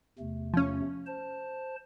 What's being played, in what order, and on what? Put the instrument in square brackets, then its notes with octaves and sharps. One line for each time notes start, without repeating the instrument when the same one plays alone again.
[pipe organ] E2 C3 A3
[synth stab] F3 C#4
[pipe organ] C5 A5